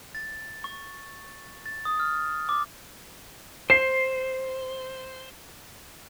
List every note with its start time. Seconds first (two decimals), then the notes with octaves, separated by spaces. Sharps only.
0.15 A6
0.64 C#6
1.66 A6
1.85 D#6
1.99 F6
2.49 D6
3.70 C5 C7